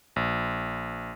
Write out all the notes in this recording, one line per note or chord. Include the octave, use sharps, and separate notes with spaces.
A#1